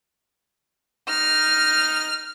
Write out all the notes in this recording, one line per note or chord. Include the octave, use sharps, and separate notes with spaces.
D#4 F6